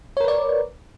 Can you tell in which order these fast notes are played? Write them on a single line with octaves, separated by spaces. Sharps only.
C#5 A#4 B4 D5